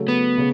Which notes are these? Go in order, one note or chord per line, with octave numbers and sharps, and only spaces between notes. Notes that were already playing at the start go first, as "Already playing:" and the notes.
Already playing: C#3 F#3 A3
B3
C#3